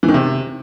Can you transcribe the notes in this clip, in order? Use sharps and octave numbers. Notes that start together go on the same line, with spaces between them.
E3
D#3
C3